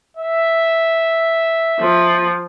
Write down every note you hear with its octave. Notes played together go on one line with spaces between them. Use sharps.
E5
F3